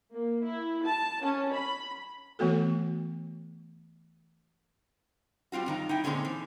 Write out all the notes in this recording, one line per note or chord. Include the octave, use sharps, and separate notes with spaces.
A#3
E4
A5
C#4
B5
E3 A3 B3 F#4 A4
G3 C4 F4 F#4
G2 D#3 A#5
D#4 E4 G5
A#2 D3 G#3 C4 C#4 G#4
E3